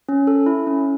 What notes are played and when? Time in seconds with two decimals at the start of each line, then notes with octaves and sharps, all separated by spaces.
0.09 C#4
0.27 A4
0.46 E4
0.67 C#4